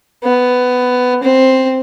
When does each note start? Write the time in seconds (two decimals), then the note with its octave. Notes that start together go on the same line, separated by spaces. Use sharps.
0.24 B3
1.23 C4